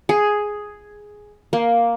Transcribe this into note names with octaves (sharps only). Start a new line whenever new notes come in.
G#4
A#3